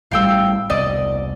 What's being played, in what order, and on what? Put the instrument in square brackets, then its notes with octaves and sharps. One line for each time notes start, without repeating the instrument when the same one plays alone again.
[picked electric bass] A1 A2 G3 [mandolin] F5 G5 E6
[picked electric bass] E1 C2 [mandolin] D5 D#5